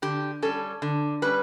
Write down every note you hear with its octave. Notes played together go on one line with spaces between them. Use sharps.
D3 G4
G3 C#4 A4
D3
G3 C#4 B4